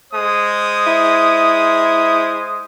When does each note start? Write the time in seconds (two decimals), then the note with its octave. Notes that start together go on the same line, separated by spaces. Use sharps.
0.13 G#3 C5 D#6
0.87 E4